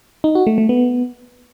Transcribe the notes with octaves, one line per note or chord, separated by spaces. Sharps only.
D#4
F#4
A3
A3
B3